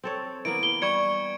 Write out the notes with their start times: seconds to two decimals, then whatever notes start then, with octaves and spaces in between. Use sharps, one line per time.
0.03 C4 A4 C#5
0.45 E3 A#3 B3 D7
0.63 G7
0.82 G3 C#6 G#6 C#7